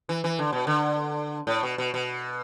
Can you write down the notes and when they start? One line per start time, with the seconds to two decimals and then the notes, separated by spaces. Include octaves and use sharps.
0.09 E3
0.24 E3
0.39 D3
0.53 B2
0.67 D3
1.47 A2
1.63 B2
1.78 B2
1.94 B2